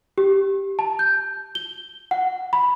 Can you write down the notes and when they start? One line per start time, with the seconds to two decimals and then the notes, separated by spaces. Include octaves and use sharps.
0.18 G4
0.79 A5
0.99 G6
1.55 G7
2.11 F#5
2.53 B5